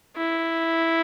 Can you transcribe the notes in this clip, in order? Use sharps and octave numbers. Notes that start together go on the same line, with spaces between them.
E4